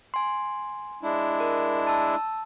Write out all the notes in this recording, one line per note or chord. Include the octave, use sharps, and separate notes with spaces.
G#5 C6
G#3 D4 E4
A#4
A5 E6